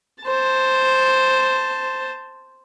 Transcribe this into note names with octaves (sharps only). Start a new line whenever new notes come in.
C5 A5